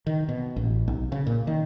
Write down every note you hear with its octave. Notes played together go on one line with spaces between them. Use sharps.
D#3
B2
A1
B1
C#3
A#2
D#3